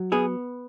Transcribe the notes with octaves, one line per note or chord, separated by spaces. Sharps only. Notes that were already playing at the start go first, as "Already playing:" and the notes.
Already playing: F#3
B3 G#4